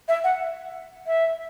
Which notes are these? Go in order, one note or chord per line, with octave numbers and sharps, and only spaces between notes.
E5
F#5
E5